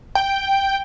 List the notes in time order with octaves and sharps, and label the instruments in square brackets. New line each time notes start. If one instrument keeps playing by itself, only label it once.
[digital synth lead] G5